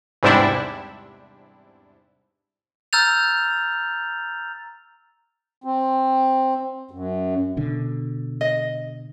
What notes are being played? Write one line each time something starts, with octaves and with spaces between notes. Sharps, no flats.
E2 G#2 C3 G3 D4 E4
A#5 E6 F6 G6 A6 F7
C4
F#2
B2 D3
D#5